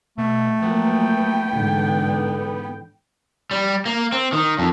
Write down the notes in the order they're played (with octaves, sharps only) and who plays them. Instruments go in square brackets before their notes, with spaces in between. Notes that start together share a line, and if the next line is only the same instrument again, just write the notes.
[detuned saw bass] B2 [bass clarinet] A3
[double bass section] F3 F#3 A#3 [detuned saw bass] B3 [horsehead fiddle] G5
[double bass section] G#2 D3 E3
[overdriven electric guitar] G3
A#3
C4
D#3
F2